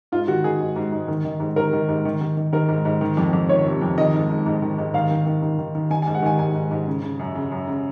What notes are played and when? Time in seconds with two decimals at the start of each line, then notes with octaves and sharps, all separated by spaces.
0.12 G#2 F4
0.28 D#3 F#4
0.44 D#3 G#4
0.60 G#2
0.76 G#2
0.92 G#2
1.08 D#3
1.25 D#3
1.40 G#2
1.56 D#3 A#4
1.73 D#3
1.88 G#2
2.05 D#3
2.21 D#3
2.37 D#3
2.53 D#3 A#4
2.69 G#2
2.85 G#2
3.01 D#3
3.17 F2
3.33 F2
3.49 D#3 C#5
3.66 C3
3.82 F2
3.97 D#3 D#5
4.13 G#2
4.29 G#2
4.46 G#2
4.62 D#3
4.78 G#2
4.94 D#3 F5
5.11 D#3
5.26 D#3
5.42 D#3
5.59 D#3
5.75 D#3
5.90 D#3 G#5
6.02 G#5
6.07 G#2
6.15 F#5
6.22 D#3 G#5
6.39 G#2 G#5
6.54 G#2
6.71 G#2
6.87 C#3
7.02 C#3
7.19 F#2
7.35 C#3
7.51 F#2
7.67 C#3